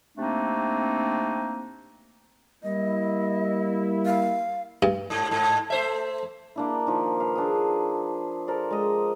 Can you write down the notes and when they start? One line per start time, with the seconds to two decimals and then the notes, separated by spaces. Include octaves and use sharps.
0.17 C3 A3 A#3 C4 D4 D#4
2.63 G3 A#3 E4 D#5
4.06 F5
4.83 G2
5.10 G#2
5.31 G#2
5.70 A3 C5 E5
6.56 A#3 D4 E4
6.87 D#3 F3
7.20 B4 F5
7.35 D4 G#4
8.48 A4 A#4 C5 D5
8.70 G#3 D#5